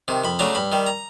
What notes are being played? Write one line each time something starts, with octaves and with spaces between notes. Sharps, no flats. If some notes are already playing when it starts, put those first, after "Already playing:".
C3 D#3
F2 B5
C#3 F#3 A3 D4 A#5
G2 B5
D#3 G3
A#5